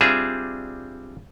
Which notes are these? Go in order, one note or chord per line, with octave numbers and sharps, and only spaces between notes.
G3 C4 D4 F4 G#4 E5